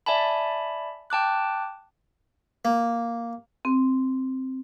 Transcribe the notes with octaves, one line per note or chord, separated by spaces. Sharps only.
D5 E5 G#5 A5 B5
G5 A5 D6 F#6
A#3
C4